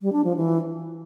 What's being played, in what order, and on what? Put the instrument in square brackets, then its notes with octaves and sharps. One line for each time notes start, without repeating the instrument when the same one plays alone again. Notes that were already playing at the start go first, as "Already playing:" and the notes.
[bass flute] G3
D4
F3
E3